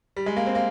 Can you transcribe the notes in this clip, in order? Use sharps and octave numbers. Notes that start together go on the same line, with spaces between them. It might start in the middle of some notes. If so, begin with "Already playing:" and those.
G3
G#3
A#3
C4
A#3